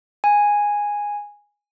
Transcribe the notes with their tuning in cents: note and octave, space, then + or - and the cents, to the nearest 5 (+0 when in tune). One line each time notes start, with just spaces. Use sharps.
G#5 -10